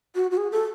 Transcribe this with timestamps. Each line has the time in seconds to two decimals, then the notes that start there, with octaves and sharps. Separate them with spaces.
0.15 F#4
0.31 F#4
0.37 G#4
0.52 A4